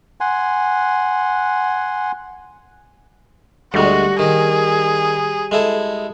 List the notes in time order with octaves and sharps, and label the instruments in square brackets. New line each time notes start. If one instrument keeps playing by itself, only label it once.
[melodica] F#5 G#5 C6
[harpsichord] D2 G#3 [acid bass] G3 [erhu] F#4
[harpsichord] D#3 [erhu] G#4
[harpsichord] G#3 E4 A4